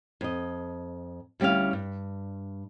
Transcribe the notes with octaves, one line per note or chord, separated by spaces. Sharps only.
F2 D#5
D2 G3 C#4 E4 F5
G2